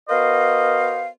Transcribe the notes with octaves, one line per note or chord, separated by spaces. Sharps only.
B3 F#4 A#4 C5 D#5 F5